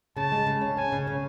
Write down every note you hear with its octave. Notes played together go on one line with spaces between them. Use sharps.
C#3 A5
G#3
C#3
C#4
C#4 G#5
C#3
C#4